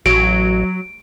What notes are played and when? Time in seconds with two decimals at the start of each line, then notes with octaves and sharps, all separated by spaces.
0.06 A1 F#3 D7